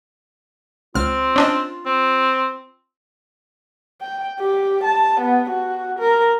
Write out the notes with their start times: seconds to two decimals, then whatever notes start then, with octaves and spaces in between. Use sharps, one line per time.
0.95 C#2 C4 F4 F6
1.36 C#4 D4 D#5
1.86 C4
4.02 G5
4.40 G4
4.84 A5
5.21 B3
5.50 F#4
5.99 A#4